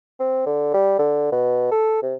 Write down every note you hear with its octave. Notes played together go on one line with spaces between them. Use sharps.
C4
D3
G3
D3
B2
A4
C3